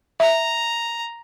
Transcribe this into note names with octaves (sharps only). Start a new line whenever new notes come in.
E5 A#5